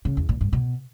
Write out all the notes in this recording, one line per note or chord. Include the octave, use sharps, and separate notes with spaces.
C#3
E2
A#2
G2
B2